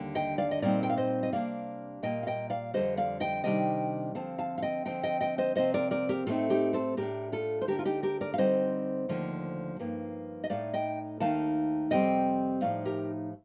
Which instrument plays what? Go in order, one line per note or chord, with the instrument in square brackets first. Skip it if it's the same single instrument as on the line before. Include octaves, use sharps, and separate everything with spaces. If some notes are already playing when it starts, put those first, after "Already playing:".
Already playing: [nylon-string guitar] D#2 D3 G3 D4
D#5 G5
D5 F5
D#5
A#2 G3 C4 D#4 A#4 D5
G5
F5
C5 D#5
D#5
C3 G3 A#3 D4 D5 F5
A#2 G3 A#3 D#5 G5
F5
D#5 G5
D5 F5
F2 D3 G3 C5 D#5
D5 F5
D#5 G5
C3 D#3 G3 D4 D#5 G5
D3 F3 C4 F5 A5
F5 A5
F5
D#5 G5
D3 F3 C4 D#4 D#5 G5
D#5 G5
D#5 G5
C5 D#5
C3 F3 C4 C5 D#5
A#4 D5
A#4 D5
G4 A#4
A2 A3 C4 D#4 F4 A4
D#4 G4
A4 C5
A2 A3 D4 G4 A#4
F4 A4
C5
D2 D3 A3 D4 G4 A#4
F4
D#4 G4
G4 A#4
A#4 D5
F5
D3 G3 C4 D#4 C5 D#5
D#2 D3 F3 A3
G2 F3 A#3 D#4
D#5
A2 A3 D#4 D5 F5
D#5 G5
D#2 D#3 A3 D#4 F5 A5
F2 C3 G3 C4 D#5 G5
A2 F3 A3 D#4 D5 F5
G4 A#4